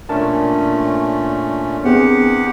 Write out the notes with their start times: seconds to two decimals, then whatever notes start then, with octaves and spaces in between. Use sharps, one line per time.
0.09 A#2 A3 C#4 D4 A#4 A5
1.84 E2 B3 C4 G4 G#4 F#5